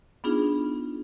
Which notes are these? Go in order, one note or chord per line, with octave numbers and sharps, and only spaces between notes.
B3 D4 D#4 F4 G#4